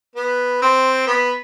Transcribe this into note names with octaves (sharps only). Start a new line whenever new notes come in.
B3
C4
B3